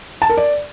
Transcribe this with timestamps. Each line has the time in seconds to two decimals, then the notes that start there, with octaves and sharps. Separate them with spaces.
0.22 A5
0.30 A#4
0.37 D5